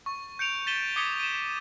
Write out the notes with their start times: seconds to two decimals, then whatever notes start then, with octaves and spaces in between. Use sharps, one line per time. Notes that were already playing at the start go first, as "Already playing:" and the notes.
0.06 C#6
0.39 G6 C#7 D7 F7
0.67 A6 B6 D#7 E7 G7
0.96 D6 D#6 G#6 B6 C#7 G7
1.20 D#7 E7